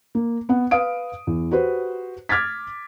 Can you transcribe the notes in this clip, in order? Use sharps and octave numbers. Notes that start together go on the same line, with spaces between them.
A#3
B3 F#5
B4 F5 D#6 D7
E2
F#4 G4 B4 C5
D6 F6 G#6 A6 B6